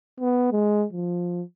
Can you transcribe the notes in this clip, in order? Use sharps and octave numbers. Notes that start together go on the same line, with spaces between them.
B3
G#3
F3